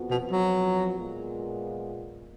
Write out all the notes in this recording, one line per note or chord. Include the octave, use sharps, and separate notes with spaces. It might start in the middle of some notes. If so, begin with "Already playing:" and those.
Already playing: F2 F3 B3 F#4
B2
F#3
A#2 G#3 B3 F4